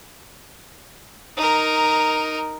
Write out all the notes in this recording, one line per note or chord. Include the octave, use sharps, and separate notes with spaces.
D#4 A#4